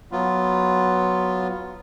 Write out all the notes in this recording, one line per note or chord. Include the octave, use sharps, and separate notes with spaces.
F#3 B3 F4